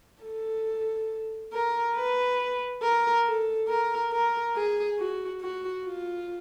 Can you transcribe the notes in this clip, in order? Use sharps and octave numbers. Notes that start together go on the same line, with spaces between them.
A4
A#4
B4
A#4
A4
A#4
A#4
G#4
F#4
F#4
F4